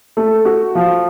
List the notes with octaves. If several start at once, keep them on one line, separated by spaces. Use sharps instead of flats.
A3
F#4
F3